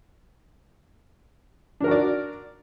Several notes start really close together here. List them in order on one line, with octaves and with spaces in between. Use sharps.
D4 A#4 F#4 D5